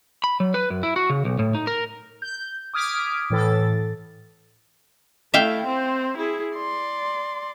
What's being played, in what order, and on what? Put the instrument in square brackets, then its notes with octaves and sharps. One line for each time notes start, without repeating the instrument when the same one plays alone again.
[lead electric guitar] B5
F#3
B4
F#2
E4
F#4
C#3
B1
A2
D#4
A#4
[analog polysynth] G6
D6 D#6 F6 G#6 B6 D7
A2 E3 A4 A6
[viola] A3 E4 [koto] E5 F5 G5
[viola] C4 C5
E4 G#4
D5 C6